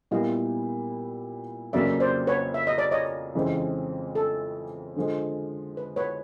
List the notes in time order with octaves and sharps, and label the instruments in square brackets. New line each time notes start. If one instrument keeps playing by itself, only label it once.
[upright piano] A#2 G3 B3 E4 [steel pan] D#5 F5
[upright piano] F2 C#3 F#3 A#3 [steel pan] D5 E5
[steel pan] C5 D5
B4 C#5
E5
D#5
D5
C#5 D#5
[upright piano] F2 C#3 E3 G#3 C4
[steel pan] A4
[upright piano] D3 F3 G#3
[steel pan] B4
B4 C#5